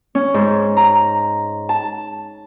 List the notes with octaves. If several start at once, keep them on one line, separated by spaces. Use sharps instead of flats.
C#4
G#2
A#5
A5